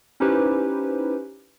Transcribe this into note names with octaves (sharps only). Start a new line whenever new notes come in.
C#4 D#4 E4 G4 B4 C5